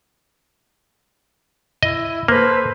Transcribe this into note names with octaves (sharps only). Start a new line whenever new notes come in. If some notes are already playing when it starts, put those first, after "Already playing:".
E4 D#5
A#3 A4 B4 C5